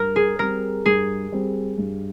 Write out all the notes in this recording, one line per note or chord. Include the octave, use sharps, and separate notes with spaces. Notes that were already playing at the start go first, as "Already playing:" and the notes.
Already playing: G2 A#4
G#4
G3 C4 A#4
G2 G#4
G3 C4
G2